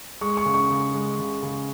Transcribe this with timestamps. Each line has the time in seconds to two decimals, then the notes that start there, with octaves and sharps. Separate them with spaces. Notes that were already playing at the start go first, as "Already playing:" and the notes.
0.21 G#3 C#6
0.37 C#6
0.46 C#3
0.54 C#6
0.70 C#3
0.94 G#3
1.19 C#3
1.43 C#3